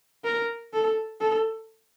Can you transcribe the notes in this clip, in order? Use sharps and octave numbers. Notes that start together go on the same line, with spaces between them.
A#4
A4
A4